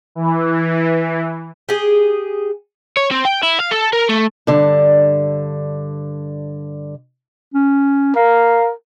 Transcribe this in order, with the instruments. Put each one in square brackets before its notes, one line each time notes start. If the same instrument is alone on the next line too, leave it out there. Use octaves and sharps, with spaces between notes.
[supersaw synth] E3
[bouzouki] G4 G#4
[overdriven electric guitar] C#5
C4
G5
E4
F5
A4
A#4
A3
[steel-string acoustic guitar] G2 D3
[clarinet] C#4
[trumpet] A#4 [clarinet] F5